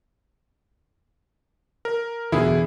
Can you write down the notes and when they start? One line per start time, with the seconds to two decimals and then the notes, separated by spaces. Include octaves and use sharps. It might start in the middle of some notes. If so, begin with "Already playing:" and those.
1.85 A#4
2.32 E2 B2 D3 E4 G#4